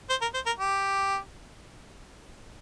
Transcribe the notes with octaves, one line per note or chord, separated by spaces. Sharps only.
C5
A#4
C5
A#4
G4